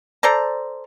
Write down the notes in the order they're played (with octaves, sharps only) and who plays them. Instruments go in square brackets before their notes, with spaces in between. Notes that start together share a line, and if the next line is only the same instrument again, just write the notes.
[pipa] A4 C5 D5 A#5